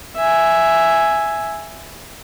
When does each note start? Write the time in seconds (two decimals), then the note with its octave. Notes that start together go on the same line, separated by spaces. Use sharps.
0.16 E5 G#5